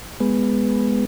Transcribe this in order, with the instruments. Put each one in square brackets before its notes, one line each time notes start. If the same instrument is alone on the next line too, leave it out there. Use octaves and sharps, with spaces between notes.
[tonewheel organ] G#3 B3